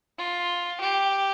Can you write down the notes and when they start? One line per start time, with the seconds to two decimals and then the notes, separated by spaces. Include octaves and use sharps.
0.18 F4
0.81 G4